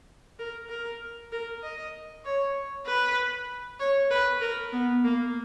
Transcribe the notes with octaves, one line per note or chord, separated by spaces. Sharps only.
A#4
A#4
A#4
D#5
C#5
B4
C#5
B4
A#4
B3
A#3